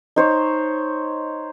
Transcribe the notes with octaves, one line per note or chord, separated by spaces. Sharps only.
D#4 C5 C#5